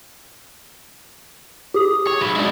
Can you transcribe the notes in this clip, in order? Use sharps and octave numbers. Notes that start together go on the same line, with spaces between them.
G4 G#4 D#6
C#5
F#3 B4
G#3 D4